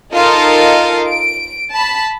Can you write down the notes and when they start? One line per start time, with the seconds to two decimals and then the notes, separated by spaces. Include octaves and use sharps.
0.14 D#4 F4 A4 A#4 D#5 F5
1.07 D7
1.73 A5 B5